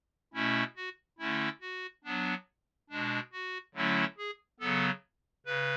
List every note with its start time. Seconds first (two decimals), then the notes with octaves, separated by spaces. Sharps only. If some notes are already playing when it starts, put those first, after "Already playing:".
0.34 B2 A3 C#4 E4
0.77 F#4
1.19 D3 A3 C#4 E4
1.61 F#4
2.04 F#3 B3 D4
2.89 B2 G#3 D4
3.32 F#4
3.75 D3 F#3 A3 C#4 E4
4.18 G#4
4.60 C#3 F#3 B3 A4
5.46 C#3 B4